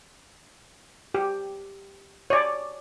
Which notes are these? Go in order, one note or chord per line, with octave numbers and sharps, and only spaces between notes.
G4
C#5 D5